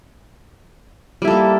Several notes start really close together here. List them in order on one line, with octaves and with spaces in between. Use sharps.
G3 E4 A4 A#3